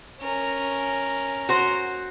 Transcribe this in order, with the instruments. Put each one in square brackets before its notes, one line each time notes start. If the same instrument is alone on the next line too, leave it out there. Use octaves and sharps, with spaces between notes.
[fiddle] C#4 A#4
[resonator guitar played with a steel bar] F#4 C5